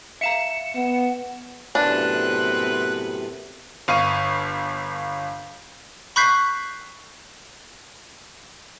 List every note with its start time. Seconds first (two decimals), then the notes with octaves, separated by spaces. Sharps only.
0.21 E5 F5 A#5 C#7 E7
0.75 B3 F#5
1.75 F#2 A2 C3 B3 C4 D4 B4 F#6
3.88 G1 F5 C#6 D#7
6.16 B5 C#6 F#6 G6 B6 C7